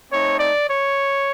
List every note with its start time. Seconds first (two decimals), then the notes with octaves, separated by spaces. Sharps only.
0.10 A3 C4 D#4 C#5
0.39 D5
0.68 C#5